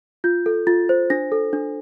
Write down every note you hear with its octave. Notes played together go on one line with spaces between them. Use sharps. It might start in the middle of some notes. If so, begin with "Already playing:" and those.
F4 G6
A4
F4 A6
C5
D4 A#6
A4
D4